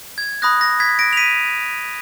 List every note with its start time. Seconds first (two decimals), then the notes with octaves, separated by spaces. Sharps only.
0.18 G#6
0.42 B5 D#6 F#6 A#6
0.61 A#6
0.80 G#6 B6
0.99 A#6 D7
1.13 F7
1.17 B6 D#7